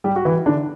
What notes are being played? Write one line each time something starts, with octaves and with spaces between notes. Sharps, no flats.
G3 G4
F#4
E3 E4
D3 D4